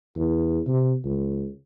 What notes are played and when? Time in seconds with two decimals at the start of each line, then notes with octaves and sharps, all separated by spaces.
0.17 E2
0.67 C3
1.04 C#2